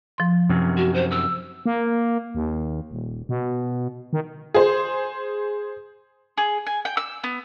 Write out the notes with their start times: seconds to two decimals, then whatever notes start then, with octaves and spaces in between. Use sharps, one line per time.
0.18 F3 C6
0.49 F#2 C3
0.77 F#4
0.94 C5
1.11 E6
1.66 A#3
2.35 D#2
2.91 D#1
3.29 B2
4.13 D#3
4.54 G#4 C5
6.38 G#4
6.67 G#5
6.85 G5
6.97 E6
7.24 B3